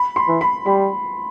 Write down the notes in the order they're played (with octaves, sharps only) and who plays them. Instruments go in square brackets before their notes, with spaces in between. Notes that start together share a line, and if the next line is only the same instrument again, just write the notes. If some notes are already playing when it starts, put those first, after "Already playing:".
Already playing: [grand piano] B5
C6
[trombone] E3
[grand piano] B5
[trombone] G3 [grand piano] B5